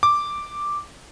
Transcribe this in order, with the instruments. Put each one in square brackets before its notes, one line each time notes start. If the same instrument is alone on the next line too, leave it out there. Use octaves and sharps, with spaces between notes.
[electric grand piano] D6